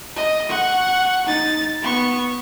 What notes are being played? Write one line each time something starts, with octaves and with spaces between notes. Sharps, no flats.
D#5
F#5 C#6
D#4 A6
B3 C#6